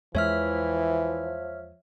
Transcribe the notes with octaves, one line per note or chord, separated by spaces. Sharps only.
E2 E3 F3 G#3 C#5 E5 F6